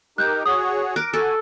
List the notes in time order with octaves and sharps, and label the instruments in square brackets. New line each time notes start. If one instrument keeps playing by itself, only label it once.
[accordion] D#4 G4 A#4 [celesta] F#6 G6
[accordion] F#4 G#4 C#5 [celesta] D#6
[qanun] A#4 D6 [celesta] F#6
[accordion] F#4 G#5 [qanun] A4